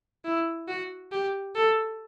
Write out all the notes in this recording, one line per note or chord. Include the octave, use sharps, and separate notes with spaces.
E4
F#4
G4
A4